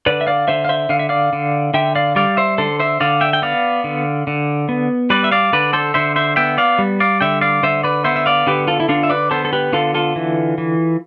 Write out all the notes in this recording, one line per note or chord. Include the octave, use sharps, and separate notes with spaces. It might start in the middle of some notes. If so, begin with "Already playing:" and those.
D3 B4 D5
E5
D5 F5
D3 C5 E5
F5
C5 E5
D3 F5
E5
D5 F5
D3
D3 E5 G5
D5 F5
G3 D5 F5
C5 E5
D3 A4 C5
C5 E5
D3 D5 F5
E5 G5
G5
B3 D5 F5
D3
D3
B3
G3 B4 D5
E5
D5 F5
D3 B4 D5
A4 C5
D3 C5 E5
C5 E5
B3 E5 G5
D5 F5
G3
D5 F5
D3 E5 G5
D5 F5
D3 C5 E5
B4 D5
B3 C5 E5
E5
D5 F5
D3 G4 B4
F4 A4
E4
D3 D4 F4
E5
B4 D5
B3 A4 C5
A4
G4 B4
D3 F4 A4
F4 A4
E3
E3